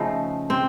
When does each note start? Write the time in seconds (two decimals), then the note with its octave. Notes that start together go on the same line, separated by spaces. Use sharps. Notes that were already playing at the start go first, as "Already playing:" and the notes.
Already playing: C#3 F3 A3 D#4
0.50 C4